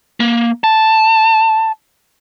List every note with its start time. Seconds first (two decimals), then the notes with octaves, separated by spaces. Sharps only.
0.20 A#3
0.64 A5